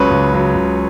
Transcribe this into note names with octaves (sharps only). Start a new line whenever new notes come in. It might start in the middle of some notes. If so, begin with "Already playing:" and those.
Already playing: C#2 C#3 F#3 B4 C#5
C#2
C#3 F#3
C#2